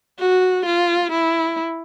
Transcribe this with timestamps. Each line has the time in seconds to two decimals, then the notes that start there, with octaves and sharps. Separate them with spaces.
0.19 F#4
0.66 F4
1.12 E4